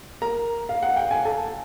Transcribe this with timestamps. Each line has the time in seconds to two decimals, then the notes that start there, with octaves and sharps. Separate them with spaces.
0.22 A#4 A#5
0.69 F5
0.83 F#5
0.96 G5
1.11 G#5
1.25 A4 A5